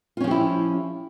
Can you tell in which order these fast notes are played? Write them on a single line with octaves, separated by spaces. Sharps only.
F4 C#4 F3 G4 E4